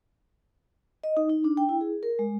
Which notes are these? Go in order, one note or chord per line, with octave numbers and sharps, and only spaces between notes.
D#5
D#4
D#4
D4
G5
E4
G#4
A#4
G#3